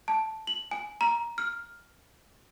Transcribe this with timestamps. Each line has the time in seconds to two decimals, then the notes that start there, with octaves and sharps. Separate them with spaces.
0.08 A5
0.47 F#7
0.71 G#5
1.01 A#5
1.38 F6